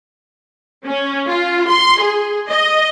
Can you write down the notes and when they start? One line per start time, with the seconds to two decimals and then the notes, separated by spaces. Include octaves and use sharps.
0.86 C#4
1.29 F4
1.70 C6
2.01 G#4
2.52 D#5